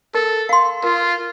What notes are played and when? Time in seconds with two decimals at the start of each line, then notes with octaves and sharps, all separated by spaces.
0.14 A4 A#4
0.49 F5 C6
0.83 F4 A#4